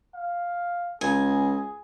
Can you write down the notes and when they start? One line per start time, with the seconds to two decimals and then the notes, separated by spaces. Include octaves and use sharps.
0.14 F5
1.01 C#2 G#4 G#5